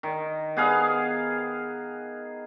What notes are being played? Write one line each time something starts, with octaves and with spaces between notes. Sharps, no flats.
D#3
B3 G#4 F5